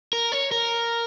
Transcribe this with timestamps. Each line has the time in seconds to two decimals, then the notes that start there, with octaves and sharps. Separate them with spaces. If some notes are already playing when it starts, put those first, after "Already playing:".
0.13 A#4
0.32 C#5
0.52 A#4